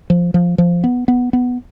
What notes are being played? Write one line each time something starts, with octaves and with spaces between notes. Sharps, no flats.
F3
F3
F3
B3
B3
B3